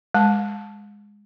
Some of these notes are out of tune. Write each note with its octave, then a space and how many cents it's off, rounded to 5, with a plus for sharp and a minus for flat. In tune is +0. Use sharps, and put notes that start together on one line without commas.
G#3 -10 A5 +0